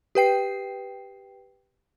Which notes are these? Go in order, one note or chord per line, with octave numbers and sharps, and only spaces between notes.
G4 B4 G5 C7